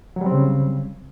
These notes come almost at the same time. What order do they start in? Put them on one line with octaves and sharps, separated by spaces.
F#3 G3 C4 C#3